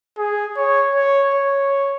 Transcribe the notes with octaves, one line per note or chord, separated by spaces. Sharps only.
G#4
C#5
C#5
C#5